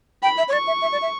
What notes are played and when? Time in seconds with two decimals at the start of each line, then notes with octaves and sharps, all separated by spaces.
0.23 G5 B5
0.38 E5
0.48 C#5
0.52 D5 C#6
0.67 E5
0.82 E5
0.92 D5
1.02 E5